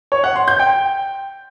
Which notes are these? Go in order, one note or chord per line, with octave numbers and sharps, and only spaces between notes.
C#5
F#5
C6
G6
G5